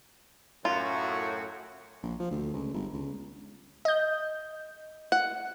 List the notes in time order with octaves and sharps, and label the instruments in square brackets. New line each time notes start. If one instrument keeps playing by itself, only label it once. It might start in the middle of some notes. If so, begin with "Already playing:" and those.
[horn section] F#2 A2 F#4 [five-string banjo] F4
[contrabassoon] A#1
F3
D2
C#2
G1
C#2
[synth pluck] D#5 G6
[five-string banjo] F#5